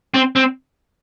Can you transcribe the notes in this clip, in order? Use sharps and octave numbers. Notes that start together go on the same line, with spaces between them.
C4
C4